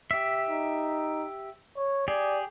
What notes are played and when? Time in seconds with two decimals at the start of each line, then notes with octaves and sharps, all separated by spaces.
0.11 G4 E5
0.49 D#4
1.77 C#5
2.08 G4 G#4 D5